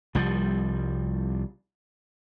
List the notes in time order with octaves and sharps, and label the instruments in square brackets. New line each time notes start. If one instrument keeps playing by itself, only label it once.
[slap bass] C2 F3 G3